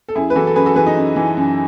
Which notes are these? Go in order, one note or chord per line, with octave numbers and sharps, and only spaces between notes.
A4
F#2 E4 G#4
B4
E3 F#4 A4
A4
F#2 G#4 B4
F#4 A4
E3 G#4 B4
D#4
F#2
E3
F#2